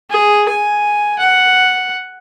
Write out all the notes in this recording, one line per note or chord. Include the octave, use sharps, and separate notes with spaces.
G#4
G#5
F#5